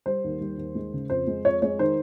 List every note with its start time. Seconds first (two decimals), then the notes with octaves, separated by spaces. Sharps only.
0.06 G3 C5
0.24 D#2
0.41 G3
0.58 D#2
0.75 G#3
0.93 C#3
1.10 F2 C5
1.27 G#3
1.45 F2 C#5
1.62 G#3 C#5
1.79 D#3 C5